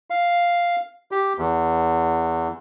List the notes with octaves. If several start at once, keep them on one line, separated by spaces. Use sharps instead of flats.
F5
G4
E2